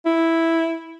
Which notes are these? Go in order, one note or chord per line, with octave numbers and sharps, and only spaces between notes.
E4